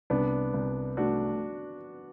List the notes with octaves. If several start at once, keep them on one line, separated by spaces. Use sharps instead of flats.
C2 B3 D4
C2
A3 D4 F#4